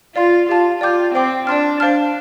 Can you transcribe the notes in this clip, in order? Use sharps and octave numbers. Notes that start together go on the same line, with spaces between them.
F4 D5 F5 C6
F4 G4 F5 A5
F4 D5 G5 D6 G6
C4 C5 G5 D6
D4 D5 A5 C6 F6
D4 C5 F5 A5 F6